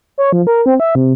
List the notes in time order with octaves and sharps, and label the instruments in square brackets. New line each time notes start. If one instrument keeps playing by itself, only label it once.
[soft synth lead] C#5
F3
A#4
C4
E5
C3